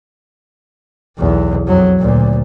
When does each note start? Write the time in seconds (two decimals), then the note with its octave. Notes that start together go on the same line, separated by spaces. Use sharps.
1.18 B1 E2
1.67 F2 F#3
1.99 D2 A#2